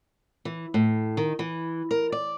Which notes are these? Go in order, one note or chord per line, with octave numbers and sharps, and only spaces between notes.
E3
A2
D#3
E3
A#4
D5